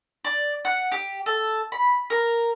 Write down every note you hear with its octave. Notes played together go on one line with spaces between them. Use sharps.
D5
F#5
G4
A4
B5
A#4